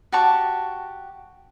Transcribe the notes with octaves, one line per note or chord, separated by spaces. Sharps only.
F#4 G4 A5 C#6